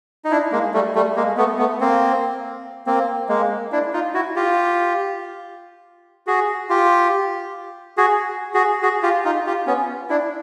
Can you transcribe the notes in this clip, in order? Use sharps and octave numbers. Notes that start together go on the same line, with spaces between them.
D#4
D4 E4
G#3 A#3
G3 A3
G3 A3
G#3 A#3
A3 B3
A3 B3
A#3 C4
A#3 C4
G#3 A#3
D4 E4
D#4 F4
E4 F#4
F4 G4
F#4 G#4
F4 G4
F#4 G#4
F#4 G#4
F#4 G#4
F4 G4
D#4 F4
F4 G4
B3 C#4
D4 E4